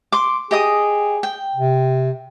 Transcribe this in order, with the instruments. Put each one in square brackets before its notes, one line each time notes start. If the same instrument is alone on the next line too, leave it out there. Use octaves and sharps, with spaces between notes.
[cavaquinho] C6 D6
[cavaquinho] G4 D#5 D#6 [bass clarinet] G#4
[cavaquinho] G5
[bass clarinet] C3